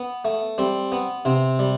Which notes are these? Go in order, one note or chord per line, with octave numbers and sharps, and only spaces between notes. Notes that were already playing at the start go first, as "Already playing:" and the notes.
Already playing: B3
A3
G3 C4
B3
C3 C4
G3